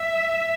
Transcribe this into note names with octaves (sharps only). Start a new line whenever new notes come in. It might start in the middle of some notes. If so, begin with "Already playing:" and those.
Already playing: E5